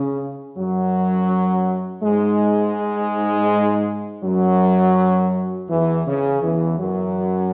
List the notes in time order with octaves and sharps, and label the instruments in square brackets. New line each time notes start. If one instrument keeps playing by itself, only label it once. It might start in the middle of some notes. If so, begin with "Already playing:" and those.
Already playing: [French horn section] C#3
F#2 F#3
G#2 G#3
F#2 F#3
E2 E3
C#3
E2 E3
F#2 F#3